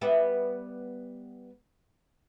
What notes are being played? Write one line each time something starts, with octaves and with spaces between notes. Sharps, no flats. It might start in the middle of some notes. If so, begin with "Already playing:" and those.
G3 B3 E5